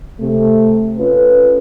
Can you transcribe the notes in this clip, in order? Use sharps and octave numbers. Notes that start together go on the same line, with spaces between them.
C3 A3
C#4 F4 A4 B4